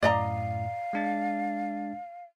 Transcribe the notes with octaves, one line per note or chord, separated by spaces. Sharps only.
F#2 A2 D5 D#5 F5 A#5
G#3 D4 A6